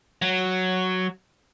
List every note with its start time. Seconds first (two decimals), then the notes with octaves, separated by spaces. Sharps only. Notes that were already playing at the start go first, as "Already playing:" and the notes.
0.22 F#3